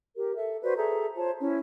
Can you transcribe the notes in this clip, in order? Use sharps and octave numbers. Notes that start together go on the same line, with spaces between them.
G4 A#4
A4 E5
F#4 B4 C5 D5
G#4 A4 E5 A#5
F4 C5 C#5 A5
C#4 E4